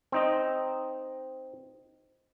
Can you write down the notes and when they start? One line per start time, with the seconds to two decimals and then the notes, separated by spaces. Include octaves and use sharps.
0.12 C4 D#4 D#5